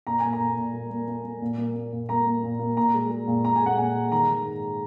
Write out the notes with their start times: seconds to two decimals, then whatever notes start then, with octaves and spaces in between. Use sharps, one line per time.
0.07 A#2 A#5
0.19 A#3 G#5
0.33 A#5
0.40 A#2
0.57 A#2
0.73 A#3
0.91 A#3
1.08 A#3
1.24 A#3
1.42 A#2
1.58 A#3
1.76 A#3
1.92 A#2
2.09 A#3 A#5
2.26 A#3
2.43 A#2
2.59 A#3
2.77 A#2 A#5
2.94 G#3
3.11 G#3
3.27 A#2
3.45 A#2 A#5
3.56 G#5
3.61 G#3 F#5
3.77 A#2 G#5
3.95 G#3
4.12 D#3 A#5
4.28 D#3
4.45 G#2